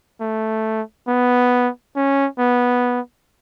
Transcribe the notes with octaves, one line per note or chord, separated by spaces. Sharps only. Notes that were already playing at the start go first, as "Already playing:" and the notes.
A3
B3
C#4
B3